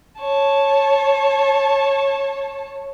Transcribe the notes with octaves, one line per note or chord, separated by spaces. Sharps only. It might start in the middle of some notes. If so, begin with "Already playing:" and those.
C#5 A5